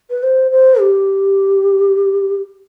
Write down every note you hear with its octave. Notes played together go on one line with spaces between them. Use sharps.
B4
C5
C5
G4